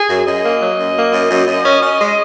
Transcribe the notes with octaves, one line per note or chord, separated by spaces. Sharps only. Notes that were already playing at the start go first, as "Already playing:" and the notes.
Already playing: G#4
F#2
F#2 D#5
A#3
F#3
F#2
A#3
F#2
F#2
F#2
C#4
C#4
G#3